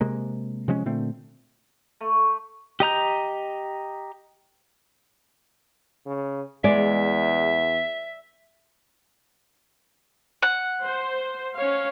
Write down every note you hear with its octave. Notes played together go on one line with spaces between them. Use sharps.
C3 G#3 A#3
C3 F3 G#3 C#4
A#2 D3 A3 C4
A3
G4 D#5 A#5 G6
C#3
E2 G#3 D5 E5
F#5
C5
C#4 C#5 F5